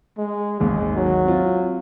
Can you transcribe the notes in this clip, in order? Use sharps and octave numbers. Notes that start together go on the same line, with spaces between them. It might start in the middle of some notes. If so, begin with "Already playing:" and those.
G#3
G#1 D#2 G#3
F#3
C4 F4